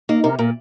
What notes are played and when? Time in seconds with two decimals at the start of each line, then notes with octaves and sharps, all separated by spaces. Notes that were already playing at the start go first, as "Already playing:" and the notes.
0.09 A#3 D#4
0.24 C3 A#4
0.39 A#2 A#4